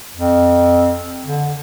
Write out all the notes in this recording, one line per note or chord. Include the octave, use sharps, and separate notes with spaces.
F2
D3